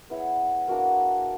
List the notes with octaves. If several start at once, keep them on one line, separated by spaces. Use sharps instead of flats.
B3 E4 G#4 C#5
A#3 D4 F#4 A#4